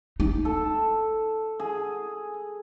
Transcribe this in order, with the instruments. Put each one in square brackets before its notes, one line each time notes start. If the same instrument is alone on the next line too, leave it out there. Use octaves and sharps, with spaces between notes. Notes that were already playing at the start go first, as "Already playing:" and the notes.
[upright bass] D#4
[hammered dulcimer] A4
G#4